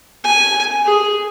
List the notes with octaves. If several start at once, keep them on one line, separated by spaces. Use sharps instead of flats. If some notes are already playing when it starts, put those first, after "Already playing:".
G#5
G#4